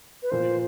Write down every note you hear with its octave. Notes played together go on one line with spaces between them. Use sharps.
B4
A#2 F3 A#3 C5